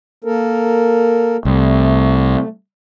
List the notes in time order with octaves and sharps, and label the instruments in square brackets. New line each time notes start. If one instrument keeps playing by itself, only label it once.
[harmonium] A#3 A4 A#4
[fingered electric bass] C2 [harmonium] A3